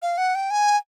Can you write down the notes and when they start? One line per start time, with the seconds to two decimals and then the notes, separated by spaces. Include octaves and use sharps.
0.02 F5
0.18 F#5
0.35 G5
0.51 G#5